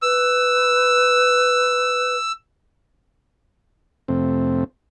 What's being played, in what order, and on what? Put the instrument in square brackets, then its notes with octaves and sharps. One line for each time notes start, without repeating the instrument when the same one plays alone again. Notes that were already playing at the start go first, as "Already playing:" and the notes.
[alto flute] B4 [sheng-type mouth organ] E6
[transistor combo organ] F2 C3 A3 C4